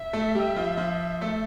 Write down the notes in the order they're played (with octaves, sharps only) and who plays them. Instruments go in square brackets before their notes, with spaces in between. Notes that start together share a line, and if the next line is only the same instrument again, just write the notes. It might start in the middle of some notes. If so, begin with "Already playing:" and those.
Already playing: [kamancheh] E5
[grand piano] A3 A4
G3 G4
F3 F4
F3 F4
A3 A4